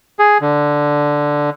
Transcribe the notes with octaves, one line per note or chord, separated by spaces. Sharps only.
G#4
D3